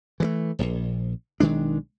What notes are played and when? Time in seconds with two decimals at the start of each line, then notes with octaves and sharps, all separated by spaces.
0.20 E3 G3 A3
0.59 D#1 A#1
1.40 B1 D#3 G#3 D4